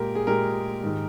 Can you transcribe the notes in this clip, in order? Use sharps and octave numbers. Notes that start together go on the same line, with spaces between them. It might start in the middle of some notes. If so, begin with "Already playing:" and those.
Already playing: A#2 G#3 G4 A#4
G#4
A#2 G#3 G4 A#4
G#2 D#3 G#3